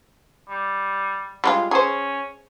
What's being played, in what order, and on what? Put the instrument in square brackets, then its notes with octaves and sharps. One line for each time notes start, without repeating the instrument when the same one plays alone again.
[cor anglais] G3
[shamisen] G3 G#3 F4
[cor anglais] C#4 [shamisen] G#4 C5